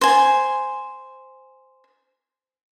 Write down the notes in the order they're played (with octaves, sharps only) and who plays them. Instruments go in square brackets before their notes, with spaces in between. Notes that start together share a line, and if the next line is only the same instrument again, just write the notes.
[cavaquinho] C5 G#5